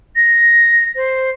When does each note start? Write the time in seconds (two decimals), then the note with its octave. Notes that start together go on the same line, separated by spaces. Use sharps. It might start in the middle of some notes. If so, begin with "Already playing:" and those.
0.16 A#6
0.96 C5